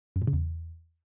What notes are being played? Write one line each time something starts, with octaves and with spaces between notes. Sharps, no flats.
F#2
A#2
C#3
E2